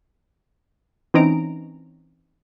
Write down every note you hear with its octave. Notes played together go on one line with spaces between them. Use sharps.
E3 C4 C#4 D#4 A#5 D7